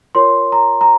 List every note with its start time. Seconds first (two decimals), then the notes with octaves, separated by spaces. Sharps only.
0.15 F4 A#4 C#5 C6
0.52 A#5
0.81 A#5